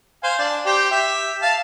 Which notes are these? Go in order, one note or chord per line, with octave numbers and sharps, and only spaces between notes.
C5 F5 G#5
D4 D5
G4 C5 G5
G4 E5
F5 A5